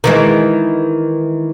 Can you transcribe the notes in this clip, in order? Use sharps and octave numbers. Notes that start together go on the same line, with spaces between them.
D#3 E3 G#3